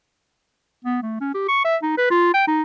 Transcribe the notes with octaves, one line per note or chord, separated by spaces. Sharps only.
B3
A3
C#4
G4
C#6
E5
D#4
B4
F4
G5
D#4